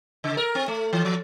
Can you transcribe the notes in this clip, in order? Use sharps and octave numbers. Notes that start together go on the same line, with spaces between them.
C#3
A#4
C4
A3
E3
F3